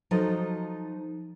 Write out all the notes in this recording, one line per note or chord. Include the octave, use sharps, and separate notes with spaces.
F3 F#3 D#4 A4 D#5